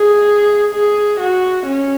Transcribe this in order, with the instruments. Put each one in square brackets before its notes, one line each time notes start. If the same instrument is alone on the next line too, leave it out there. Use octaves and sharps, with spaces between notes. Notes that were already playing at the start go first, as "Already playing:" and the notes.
Already playing: [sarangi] G#4
G#4
F#4
C#4